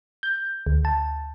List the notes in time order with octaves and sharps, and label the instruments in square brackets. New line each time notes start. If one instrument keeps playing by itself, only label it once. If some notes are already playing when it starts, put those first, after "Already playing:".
[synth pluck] G6
D2
A5